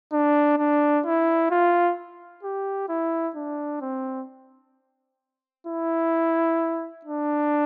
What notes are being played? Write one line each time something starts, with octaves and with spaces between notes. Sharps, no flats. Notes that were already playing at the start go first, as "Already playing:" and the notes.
D4
D4
E4
F4
G4
E4
D4
C4
E4
D4